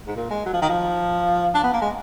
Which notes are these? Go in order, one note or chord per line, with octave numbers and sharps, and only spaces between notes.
G#2
A#2
G#3
F#3
F3
D#3
F3
D4
B3
A#3
G#3